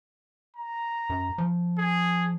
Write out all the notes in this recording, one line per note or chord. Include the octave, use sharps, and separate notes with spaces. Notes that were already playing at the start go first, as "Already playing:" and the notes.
A#5
F#2
F3
G#4